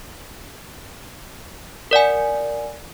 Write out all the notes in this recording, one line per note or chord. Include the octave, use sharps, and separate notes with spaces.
A#4 D5 F#5 G#5